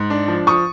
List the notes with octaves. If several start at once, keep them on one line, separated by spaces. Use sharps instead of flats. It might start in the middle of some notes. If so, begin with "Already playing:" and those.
Already playing: G#2
D4
F3
F3 C#6 D#6